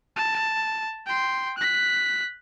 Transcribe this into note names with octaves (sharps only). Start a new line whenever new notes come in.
A5
G5 C6
F#6 B6